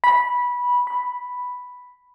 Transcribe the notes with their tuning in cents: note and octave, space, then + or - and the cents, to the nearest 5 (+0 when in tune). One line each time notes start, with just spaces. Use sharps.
B5 -15
B5 +0